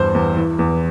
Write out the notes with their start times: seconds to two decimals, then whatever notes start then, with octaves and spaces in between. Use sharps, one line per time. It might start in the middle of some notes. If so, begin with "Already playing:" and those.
Already playing: E2 G2 C5
0.15 E2
0.37 E3
0.59 E2